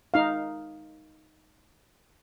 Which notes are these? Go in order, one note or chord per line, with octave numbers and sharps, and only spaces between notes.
D#4 F5